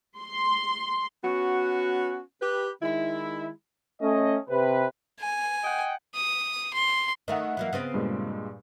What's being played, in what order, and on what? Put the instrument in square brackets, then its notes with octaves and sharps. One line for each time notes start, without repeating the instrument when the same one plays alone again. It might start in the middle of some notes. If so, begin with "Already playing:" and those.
[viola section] C6
[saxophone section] B3 C#4 F#4
G4 B4
D#3 G#3 E4
[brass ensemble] A3 C#4 D#5
C3 B4
[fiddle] G#5
[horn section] D#5 F#5 G5
[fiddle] D#6
C6
[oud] D#3 A3 D#4 [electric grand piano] D#5 E5 F#5
[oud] E3 F#3 A#3
C#3 B3 C4
[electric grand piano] G2 A#2 G#3